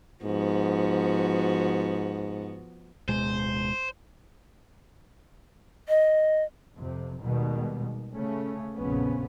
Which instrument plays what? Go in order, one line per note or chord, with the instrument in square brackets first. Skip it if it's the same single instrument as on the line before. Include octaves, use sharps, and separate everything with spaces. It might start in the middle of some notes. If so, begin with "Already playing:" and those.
[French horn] G#2 [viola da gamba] F3 B3 F#4
[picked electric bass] D1 B2 G#3 [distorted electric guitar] C5
[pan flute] D#5
[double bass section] F2 C3
D#2 B2 D#3 G3 G#3
C#3 A3 C#4
A#1 F2 C#3 B3 C#4